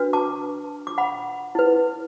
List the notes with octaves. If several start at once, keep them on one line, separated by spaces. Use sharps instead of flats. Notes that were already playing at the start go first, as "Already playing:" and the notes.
Already playing: D4 F#4 B4
A5 D6
D6
F#5 B5
E4 B4